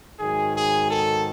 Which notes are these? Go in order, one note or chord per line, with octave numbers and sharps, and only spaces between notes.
G#2 D#3 F#3 G#4
G#4
A4